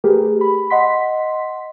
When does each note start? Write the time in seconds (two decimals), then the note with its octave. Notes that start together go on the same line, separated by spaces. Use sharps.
0.04 A3 G4 G#4 A#4 B4
0.41 B5
0.70 D#5 F#5 C6 B6